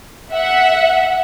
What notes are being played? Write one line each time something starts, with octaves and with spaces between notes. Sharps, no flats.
E5 F#5